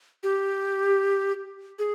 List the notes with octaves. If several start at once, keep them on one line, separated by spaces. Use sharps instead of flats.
G4
G#4